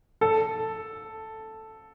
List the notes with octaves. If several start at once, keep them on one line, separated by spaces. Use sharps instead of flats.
A4